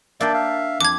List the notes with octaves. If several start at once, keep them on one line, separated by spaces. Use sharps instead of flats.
A#3 D4 D5 E5 G5
E5 F5
F2 D6 G#6